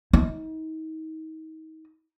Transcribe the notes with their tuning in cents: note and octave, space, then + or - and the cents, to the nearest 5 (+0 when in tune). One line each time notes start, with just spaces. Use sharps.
D#4 +35